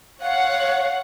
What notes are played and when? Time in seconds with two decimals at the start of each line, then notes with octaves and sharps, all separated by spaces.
0.21 C#5 F5 F#5